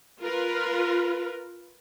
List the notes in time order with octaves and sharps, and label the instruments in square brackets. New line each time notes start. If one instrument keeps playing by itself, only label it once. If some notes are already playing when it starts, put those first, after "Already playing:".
[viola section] F4 A#4 B4